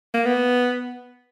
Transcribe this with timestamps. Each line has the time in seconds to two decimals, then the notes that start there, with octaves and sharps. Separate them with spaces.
0.14 A#3
0.25 B3